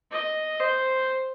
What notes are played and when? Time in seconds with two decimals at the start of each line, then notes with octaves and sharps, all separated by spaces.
0.11 D#5
0.60 C5